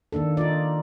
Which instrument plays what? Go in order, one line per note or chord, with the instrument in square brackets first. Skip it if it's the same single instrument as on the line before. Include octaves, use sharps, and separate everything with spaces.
[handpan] D#3 A#3 D4 A4
D#4 F4 D5